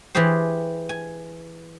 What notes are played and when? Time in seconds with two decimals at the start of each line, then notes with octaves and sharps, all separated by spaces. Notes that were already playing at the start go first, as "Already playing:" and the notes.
0.15 E3 E4 G4 G#4 C5
0.89 G#5